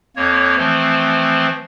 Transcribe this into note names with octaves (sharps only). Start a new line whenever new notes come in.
F2 A#3 C#5
E3 F3 A3 C4